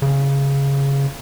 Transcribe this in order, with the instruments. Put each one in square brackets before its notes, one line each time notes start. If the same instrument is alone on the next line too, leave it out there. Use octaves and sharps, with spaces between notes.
[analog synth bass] C#3